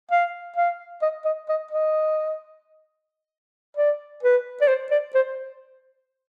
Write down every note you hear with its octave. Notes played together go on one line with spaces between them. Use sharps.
F5
F5
D#5
D#5
D#5
D#5
D5
B4
D5
C5
D5
C5